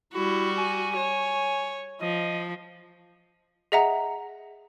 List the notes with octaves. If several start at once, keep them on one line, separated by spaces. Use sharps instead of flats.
G3 E4 F#4
G#5
C#5
F3 D#5
G#4 D#5 E5 F#5 A#5